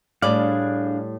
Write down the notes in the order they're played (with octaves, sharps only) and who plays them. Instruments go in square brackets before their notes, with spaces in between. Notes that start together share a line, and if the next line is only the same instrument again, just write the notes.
[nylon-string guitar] A2 G3 D5 [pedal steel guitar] D4 G#4 F5